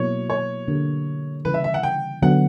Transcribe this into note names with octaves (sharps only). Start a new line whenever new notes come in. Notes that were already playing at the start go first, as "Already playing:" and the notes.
Already playing: B2 F#3 A#3 E4 C#5
C#5
D3 A#3 D4 G4 A#4
C#3 E3 G3 B4
E5
E5
F#5
G5
D3 F#3 B3 F#5